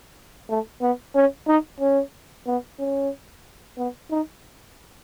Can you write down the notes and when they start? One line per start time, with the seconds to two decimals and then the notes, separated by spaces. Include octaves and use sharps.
0.49 A3
0.81 B3
1.15 C#4
1.47 D#4
1.80 C#4
2.47 B3
2.79 C#4
3.78 B3
4.11 D#4